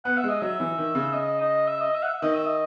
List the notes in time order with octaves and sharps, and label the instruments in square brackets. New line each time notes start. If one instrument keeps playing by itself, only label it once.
[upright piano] B3 [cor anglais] F#5
[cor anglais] E5
[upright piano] G#3
[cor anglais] D#5
[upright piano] F#3 [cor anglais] E5
[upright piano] E3
D#3
C#3
[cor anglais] D#5
D#5
E5
D#5
E5
F#5
E5
[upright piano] D#3 [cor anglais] D#5
[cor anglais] E5
D#5